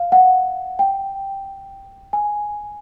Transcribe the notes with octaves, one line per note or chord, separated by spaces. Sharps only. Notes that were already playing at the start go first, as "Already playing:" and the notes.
Already playing: F5
F#5
G5
G#5